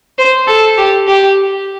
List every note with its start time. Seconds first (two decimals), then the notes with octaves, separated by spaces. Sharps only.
0.18 C5
0.47 A4
0.78 G4
1.08 G4